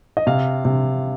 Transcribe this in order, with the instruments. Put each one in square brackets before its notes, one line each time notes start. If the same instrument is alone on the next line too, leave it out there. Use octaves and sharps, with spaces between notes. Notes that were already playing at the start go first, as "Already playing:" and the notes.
[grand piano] D#5
C3 F5
C3